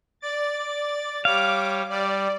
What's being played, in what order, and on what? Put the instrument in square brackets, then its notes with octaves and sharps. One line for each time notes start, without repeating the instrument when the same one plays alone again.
[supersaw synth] D5 [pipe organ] A6
[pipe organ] G3 C#5 [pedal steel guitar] F5 [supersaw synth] D6
[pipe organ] G3 [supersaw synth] D5